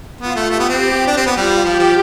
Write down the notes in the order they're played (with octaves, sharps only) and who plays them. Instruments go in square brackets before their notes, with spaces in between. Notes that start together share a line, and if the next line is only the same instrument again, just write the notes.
[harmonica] B3 [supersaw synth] F4
[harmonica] A3
[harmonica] A3 [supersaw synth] G4
[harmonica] B3
C4
[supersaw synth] G4
[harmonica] D4
C4
B3
[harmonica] G3 [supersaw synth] F4
[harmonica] F3 [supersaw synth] G4
[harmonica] F3